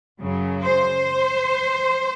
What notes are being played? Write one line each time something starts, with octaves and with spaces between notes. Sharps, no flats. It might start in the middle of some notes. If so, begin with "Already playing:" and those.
F#2 C#3 F#3
C5